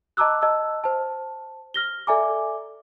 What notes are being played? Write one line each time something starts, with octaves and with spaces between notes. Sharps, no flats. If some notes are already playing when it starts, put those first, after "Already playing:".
D#5 A5 A#5 D6 E6 F#6
D#5 A5 E6
C5 A5
F6 A#6 G7
A4 D5 E5 G#5 A#5 D6